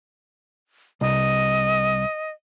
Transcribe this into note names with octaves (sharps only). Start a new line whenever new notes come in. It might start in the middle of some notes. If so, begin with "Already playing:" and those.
C2 D#5